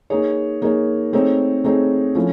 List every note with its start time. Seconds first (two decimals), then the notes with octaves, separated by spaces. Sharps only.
0.10 A#3 D#4 G#4 C#5
0.62 A#3 D#4 G#4 C#5
1.13 A3 C4 D#4 G#4 C#5
1.64 A3 C4 D#4 G#4 C#5
2.15 F3 A3 C#4 E4